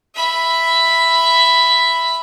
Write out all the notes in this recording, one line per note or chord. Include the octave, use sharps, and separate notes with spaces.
E5 B5